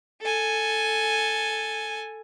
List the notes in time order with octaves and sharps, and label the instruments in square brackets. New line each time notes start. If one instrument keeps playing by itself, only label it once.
[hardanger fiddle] A4 G#5